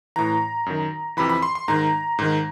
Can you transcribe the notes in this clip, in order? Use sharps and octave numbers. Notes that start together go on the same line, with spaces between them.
A2 E3 A#5
F#2 D#3
F2 C3 E3 B5
B5
C6
C6
G#2 D#3 A#5
G#2 D#3